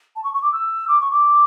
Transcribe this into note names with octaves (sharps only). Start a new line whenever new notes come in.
A5
C#6
C#6
D6
E6
D6
C#6
D6